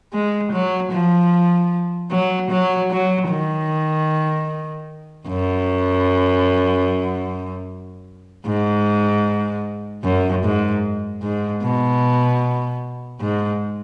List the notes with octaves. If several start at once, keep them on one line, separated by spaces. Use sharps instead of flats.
G#3
F#3
F3
F#3
F#3
F#3
D#3
F#2
G#2
F#2
G#2
G#2
B2
G#2